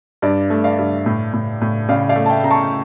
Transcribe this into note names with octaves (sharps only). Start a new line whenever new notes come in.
G2 D5
A3
D5 F5
G2
A2
A2
A2
C#3 D5 F5
D5 F5
A3
A5
E5 G5
C#3 A#5
A5 C#6